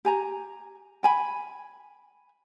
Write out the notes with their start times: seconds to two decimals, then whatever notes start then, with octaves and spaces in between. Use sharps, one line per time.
0.05 G4 G#5 A#5
1.03 G5 G#5 B5